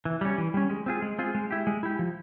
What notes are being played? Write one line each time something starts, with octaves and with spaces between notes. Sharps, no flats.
E3
G3 C#4
E3
G3 C#4
G#3
C4 F4 G#4
G#3
C4 F4 G#4
G#3
E4 G4
G#3
E4 G4
F3